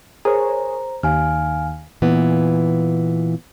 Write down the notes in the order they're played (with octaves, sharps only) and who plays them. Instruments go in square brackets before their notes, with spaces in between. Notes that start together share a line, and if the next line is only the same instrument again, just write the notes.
[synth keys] G#4 A#4 C#5 [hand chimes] C5 A#5
[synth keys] D#2 [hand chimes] F5 G#5 F6
[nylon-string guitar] A#2 E3 B3